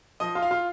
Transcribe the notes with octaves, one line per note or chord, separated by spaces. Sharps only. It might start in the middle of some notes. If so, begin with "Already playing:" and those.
F3 D#5
F4
F5
F4